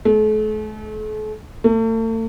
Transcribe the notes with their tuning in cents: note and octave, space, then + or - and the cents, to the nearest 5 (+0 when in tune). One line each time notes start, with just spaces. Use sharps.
A3 -40
A3 +40